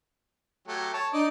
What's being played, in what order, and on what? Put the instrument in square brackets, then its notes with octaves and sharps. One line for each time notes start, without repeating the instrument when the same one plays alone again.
[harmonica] F#3 A3 G4
C#5 A5
[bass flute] D4 [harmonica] D#4 D5 D#5